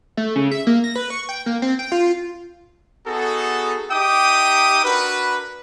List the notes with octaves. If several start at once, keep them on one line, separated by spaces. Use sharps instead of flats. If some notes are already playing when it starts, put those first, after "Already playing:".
A3
C#3
E5
A#3
A#6
B4
C#6
G5
A#3
C4
G5
F4
B3 D#4 F#4 G#4 A4
D#4 G4 E5 G5 D6 D#6
D4 F#4 A#4 B4